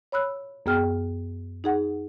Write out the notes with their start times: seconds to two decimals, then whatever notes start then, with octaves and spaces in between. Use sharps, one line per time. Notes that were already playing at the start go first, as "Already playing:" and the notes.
0.12 C#5 B5 E6 F#6
0.66 F#2 B3 G#4 G5 F6
1.64 D#4 G#4 F#5